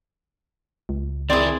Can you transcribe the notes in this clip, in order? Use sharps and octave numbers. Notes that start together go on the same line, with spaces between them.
C#2
D#3 C4 E4 G#4 D5